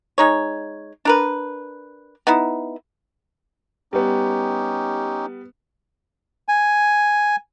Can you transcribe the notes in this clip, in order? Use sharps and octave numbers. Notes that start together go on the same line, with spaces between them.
G#3 D#4 C#5
D4 A#4 B4
B3 D#4 E4
G3 B3 C#4 D#4 G4
G#5